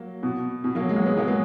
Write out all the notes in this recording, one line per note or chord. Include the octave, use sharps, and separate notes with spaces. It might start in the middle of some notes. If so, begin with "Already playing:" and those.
Already playing: F#3 A#3
B2
B2
F#3 A#3
G#3
F#3 A#3
G#3 B3
F#3 A#3
G#3 B3